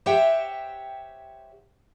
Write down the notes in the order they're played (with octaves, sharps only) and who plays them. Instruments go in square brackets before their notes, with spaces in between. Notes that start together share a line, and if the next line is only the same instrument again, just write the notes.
[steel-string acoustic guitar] G4 C5 C#5 E5 F#5 G5